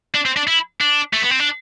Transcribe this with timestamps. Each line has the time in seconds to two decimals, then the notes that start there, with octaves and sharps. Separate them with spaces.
0.15 D4
0.26 C4
0.37 D4
0.47 E4
0.81 D4
1.14 A3
1.23 B3
1.31 C4
1.40 D4